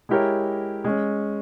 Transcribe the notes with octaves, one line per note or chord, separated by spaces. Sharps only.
G#3 E4 G4 A#4 C#5
G#3 C#4